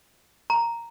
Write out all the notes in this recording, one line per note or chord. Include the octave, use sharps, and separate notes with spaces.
A#5